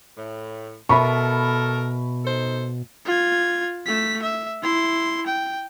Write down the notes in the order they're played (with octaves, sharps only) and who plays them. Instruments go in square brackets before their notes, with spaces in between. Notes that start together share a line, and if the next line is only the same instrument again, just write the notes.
[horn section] A2
[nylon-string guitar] B2 E5 [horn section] A4 A#4 [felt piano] B5 C#6
[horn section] D#4 A4 C5
[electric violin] F4 G#6
A3 B6
E5
E4 C6
G5